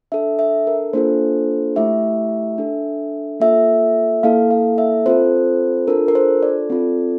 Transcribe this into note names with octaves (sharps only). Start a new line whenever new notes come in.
D4 A4 E5
E5
A#4
A#3 D4 F4 A4 C5
A3 E4 G4 E5
D4 A4
A#3 F4 A4 E5
A#3 E4 A4 F5
F5
E5
C4 F4 A4 C5
D4 F4 A4 A#4
A#4
C5
D5
C4 F4 A4